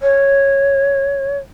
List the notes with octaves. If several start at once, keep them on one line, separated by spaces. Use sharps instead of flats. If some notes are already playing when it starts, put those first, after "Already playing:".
C#5